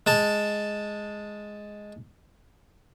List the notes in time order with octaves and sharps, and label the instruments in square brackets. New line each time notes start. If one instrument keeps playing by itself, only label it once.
[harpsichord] G#3 A5